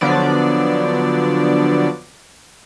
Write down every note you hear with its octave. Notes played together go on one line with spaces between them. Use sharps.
D3 F3 F#3 B3 D4 D5